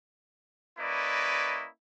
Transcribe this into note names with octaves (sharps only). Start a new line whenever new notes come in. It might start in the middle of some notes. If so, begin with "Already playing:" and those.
A#3 C#4 E4 B4 D5 D#5